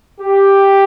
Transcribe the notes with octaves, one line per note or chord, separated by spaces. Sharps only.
G4